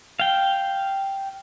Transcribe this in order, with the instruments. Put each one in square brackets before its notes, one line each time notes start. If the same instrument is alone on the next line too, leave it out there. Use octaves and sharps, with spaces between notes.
[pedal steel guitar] F5 G5